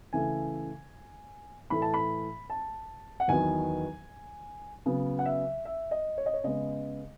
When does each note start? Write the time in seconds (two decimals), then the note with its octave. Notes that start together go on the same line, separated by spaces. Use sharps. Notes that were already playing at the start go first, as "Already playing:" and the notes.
0.13 C#3 E3 A3 G#5
1.70 A2 E3 A3 B5
1.82 A5
1.94 B5
2.50 A5
3.20 F#5
3.28 E2 D#3 F#3 B3 G#5
4.86 C#3 F#3 B3
5.19 F#5
5.26 E5
5.65 E5
5.91 D#5
6.18 C#5
6.26 D#5
6.34 C#5
6.44 C#3 G#3 B3 D#5